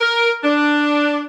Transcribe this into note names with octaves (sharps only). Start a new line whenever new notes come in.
A#4
D4